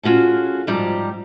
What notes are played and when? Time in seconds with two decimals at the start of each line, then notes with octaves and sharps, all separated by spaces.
0.03 C#4 F4 F#4 G#4 A4
0.67 G#2 F3 G3 C4 G4 A#5